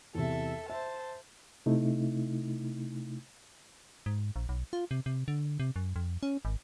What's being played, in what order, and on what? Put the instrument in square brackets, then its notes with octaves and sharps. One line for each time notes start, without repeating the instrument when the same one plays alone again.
[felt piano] E2 C3 [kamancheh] A4 E5
[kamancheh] C5 A5 [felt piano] E5
[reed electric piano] C3 A3 D#4 E4
[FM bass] G#2
A#1
B1
F4
C3
C3
D3
C3
F#2
F2
C#4
G#1